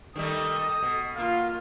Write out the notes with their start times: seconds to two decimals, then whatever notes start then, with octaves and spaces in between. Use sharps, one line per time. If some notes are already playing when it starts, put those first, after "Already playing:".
0.16 D#3 G3 A3 A4 D#5 D#6
0.82 B2
1.16 A#3 F4 F5